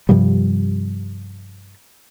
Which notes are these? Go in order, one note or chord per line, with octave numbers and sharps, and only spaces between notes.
G2 C3 F3 G3